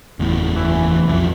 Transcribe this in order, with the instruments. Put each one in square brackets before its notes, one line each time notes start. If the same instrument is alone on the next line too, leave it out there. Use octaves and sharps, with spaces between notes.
[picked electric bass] F#1 E2 A2
[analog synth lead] E3
[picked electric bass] B1 F2 F3